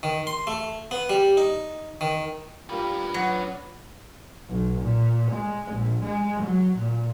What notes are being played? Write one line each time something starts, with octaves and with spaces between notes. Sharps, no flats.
D#3
C6
A3
B3
G3
D#4
D#3
G3 A#3 D4 F4 B4
F#3 B3
B1
A#2
G#3
A#1
G#3
F#3
A#2